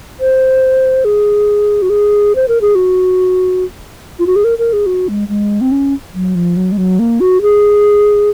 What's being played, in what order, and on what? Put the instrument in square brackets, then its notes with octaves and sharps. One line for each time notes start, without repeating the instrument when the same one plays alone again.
[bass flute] C5
G#4
F#4
G#4
C5
A#4
G#4
F#4
F4
F#4
G#4
A#4
A#4
G#4
F#4
G#3
G#3
C4
C#4
F#3
F3
F#3
G#3
F#3
A#3
F#4
G#4